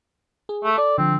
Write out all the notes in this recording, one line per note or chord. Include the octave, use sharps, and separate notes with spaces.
G#4
A3
A4 D5
D3 F3 C4